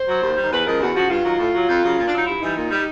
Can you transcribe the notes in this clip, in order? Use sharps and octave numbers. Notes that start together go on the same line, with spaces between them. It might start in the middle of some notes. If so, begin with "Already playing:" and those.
Already playing: C5
F#3
D#2
D#3 G3
E2 B4
C#3 F3 G#3 A#4
E2 F#4
C#3 F3 F#4
G2 F4
D#3 F#3
A2
F#3
F2
C#3 F#3
A#2
D4
F#3 D#4
G2 E4
E3 G3 D#4
A#2
G3